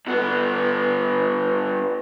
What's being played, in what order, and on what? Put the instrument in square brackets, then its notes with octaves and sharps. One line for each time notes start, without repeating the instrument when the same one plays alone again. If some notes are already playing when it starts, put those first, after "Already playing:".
[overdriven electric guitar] G2 B3